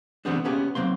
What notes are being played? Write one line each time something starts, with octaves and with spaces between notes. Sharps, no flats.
E3 G3 A3 B3 C4 D4
A#3 B3 C#4 G4 G#4
F#3 A#3 C4 C6